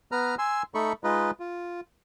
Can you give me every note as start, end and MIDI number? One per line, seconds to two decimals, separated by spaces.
0.12 0.35 59
0.12 0.35 71
0.12 0.35 82
0.12 0.35 89
0.38 0.63 80
0.38 0.63 84
0.38 0.63 88
0.75 0.93 57
0.75 0.93 63
0.75 0.93 69
0.75 0.93 83
0.75 0.93 85
1.04 1.31 56
1.04 1.31 63
1.04 1.31 65
1.04 1.31 71
1.04 1.31 75
1.40 1.81 65